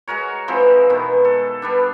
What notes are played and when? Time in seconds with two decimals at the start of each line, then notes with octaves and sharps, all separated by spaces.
0.07 G#3 F#4 A#4 C#5
0.48 E3 F3 G#3 C4
0.90 B2 D#3 B3
1.25 A4
1.62 G3 B3 D4